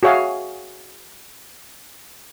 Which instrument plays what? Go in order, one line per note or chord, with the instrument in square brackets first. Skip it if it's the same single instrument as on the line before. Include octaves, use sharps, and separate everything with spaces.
[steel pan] F#4 G#4 C#5 E5 F5